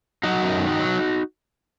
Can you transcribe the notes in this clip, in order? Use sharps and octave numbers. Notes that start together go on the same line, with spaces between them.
F#3 D#4 F#4
F#2
D#3
F#3